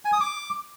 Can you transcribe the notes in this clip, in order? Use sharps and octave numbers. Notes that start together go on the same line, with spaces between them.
G#5
D#6
D6